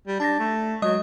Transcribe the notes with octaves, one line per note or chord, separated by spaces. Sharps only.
G3
D4 A5 A6 A#6
A3
F#3 G#3 D#5 D#6